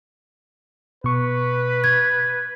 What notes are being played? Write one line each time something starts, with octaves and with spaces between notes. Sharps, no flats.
B2 B4 C#6
G#6